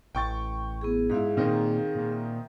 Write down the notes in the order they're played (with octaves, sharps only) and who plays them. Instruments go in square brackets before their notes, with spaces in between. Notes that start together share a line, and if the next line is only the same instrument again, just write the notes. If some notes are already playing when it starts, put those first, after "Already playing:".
[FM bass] A1 [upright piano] G5 C#6 A6
[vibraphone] B3 E4 G#4
[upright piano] G#2 E4 [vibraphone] G#4 F5
[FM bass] A#2 [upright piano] D#3 C4 D#4
[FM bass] A#2
[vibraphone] E5